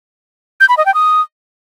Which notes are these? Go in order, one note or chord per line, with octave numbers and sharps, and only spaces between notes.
G6
B5
D#5
G5
D#6